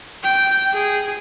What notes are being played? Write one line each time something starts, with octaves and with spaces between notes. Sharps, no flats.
G5
G#4